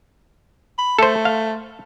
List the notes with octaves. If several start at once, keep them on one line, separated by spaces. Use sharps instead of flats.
B5
A3 A4 C5
F5